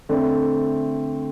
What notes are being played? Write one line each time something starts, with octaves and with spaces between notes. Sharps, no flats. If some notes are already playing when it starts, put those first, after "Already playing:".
D3 A3 C4